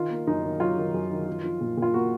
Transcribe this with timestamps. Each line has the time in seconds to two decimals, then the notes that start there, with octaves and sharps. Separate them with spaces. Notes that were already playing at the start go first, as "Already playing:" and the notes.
Already playing: D#3 F4
0.11 A#3
0.27 F#2 D#4
0.44 D#3
0.60 F#3 F4
0.77 D#3
0.94 F#2
1.11 D#3
1.27 F3
1.44 F3
1.61 A#2
1.77 A#2
1.82 F4
1.94 A#3 F#4